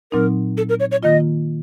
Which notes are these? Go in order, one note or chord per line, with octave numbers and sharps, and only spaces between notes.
A#2 F#3 C4 D#4 A#4
A4
A#4
C#5
C#5
D#3 A#3 F4 D#5